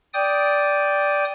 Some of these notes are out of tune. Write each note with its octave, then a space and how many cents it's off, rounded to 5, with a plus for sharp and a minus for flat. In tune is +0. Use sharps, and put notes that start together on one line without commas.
D5 -10 G5 +0 D#6 +0